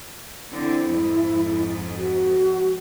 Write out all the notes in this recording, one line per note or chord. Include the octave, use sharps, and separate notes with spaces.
D3 C4 E4
F2 G#2
F#4